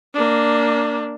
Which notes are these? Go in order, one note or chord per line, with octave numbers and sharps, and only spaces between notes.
A#3 D4